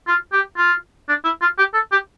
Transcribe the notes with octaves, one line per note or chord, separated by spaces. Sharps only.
F4
G4
F4
D4
E4
F4
G4
A4
G4